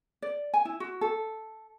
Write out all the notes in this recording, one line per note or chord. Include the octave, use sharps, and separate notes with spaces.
D5
G#5
E4
F#4
A4